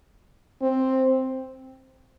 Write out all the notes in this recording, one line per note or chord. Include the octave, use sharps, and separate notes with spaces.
C4